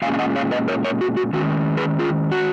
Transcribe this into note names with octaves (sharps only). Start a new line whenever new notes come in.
A#2 G#3 C#4 F5 G#5
F5
D#5 F#5
C#5 F5
B4 D#5
A#4 C#5
A#4 C#5
F#4
F#4
D#3 G#3 C#4 F#4
G#4 B4
F4 G#4
F#4